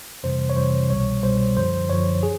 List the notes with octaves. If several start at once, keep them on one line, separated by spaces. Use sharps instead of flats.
F2 C3 E3 G3 C5
C#5
F2 C3 E3 G3 C5
C2 B2 G3 C#5
C2 B2 G3 C5
F#2 D3 F3 C5
F#2 D3 F3 C#5
G#4